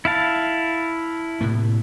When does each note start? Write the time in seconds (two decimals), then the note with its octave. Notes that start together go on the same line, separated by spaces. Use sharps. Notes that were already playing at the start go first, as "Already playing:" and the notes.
0.05 E4 F5 A5
1.41 A2 C3 A#3